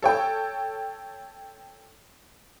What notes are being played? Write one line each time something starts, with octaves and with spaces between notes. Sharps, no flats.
A4 C#5 G5